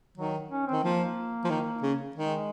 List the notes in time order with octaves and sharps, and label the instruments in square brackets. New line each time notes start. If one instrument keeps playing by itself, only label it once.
[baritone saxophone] D#3 [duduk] F#3
[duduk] C#4
[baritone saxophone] D#3 [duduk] C4
[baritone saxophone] F3 [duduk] A#3
[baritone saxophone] F3
D#3
C#3
[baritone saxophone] D#3 [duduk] G#3